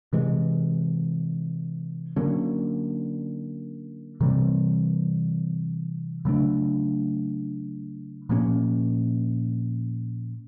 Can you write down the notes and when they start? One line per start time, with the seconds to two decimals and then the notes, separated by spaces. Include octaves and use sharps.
0.13 C3 E3 G#3
2.16 D3 F#3 A#3 C#4
4.21 C3 E3 G3 C4
6.25 C#3 F#3 A3 D4
8.29 A#2 F3 A#3 C#4